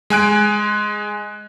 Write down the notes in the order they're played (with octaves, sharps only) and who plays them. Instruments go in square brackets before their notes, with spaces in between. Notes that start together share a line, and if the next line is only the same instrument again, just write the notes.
[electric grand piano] G#3 G#5 F#6 D7